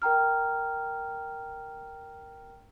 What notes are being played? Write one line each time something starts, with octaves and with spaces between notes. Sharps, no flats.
A#4 G5 A#5 F6